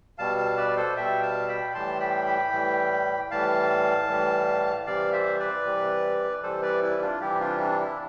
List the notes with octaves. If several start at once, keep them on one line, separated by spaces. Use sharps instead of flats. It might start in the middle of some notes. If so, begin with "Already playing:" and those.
B2 G3 F5 A5
F5 A5
B4 D5
A4 C5
B2 G3 E5 G5
F5 A5
G5 B5
A2 E3 G3 A5 C6
G5 B5
G5 B5
A2 E3 G3
A2 E3 G3 F5 A5
A2 E3 G3
C3 E3 G3 D5 F5
C5 E5
B4 D5
C3 E3 G3
C3 E3 G3 A4 C5
B4 D5
E4
D4 F4
C3 E3 G3 E4 G4
D4 F4
D4
E4